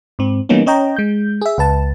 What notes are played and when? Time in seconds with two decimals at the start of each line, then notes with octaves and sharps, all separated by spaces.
0.19 G#2 C4
0.49 E3 G3 A#3 B3 C#4 D#4
0.66 C#4 C#5 D#5 G5 A#5
0.96 G#3 G6
1.41 G#4 E5
1.58 C#2 B4 A5